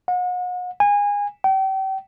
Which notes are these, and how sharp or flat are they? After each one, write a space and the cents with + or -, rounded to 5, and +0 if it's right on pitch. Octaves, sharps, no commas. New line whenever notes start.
F#5 -40
G#5 -25
G5 -35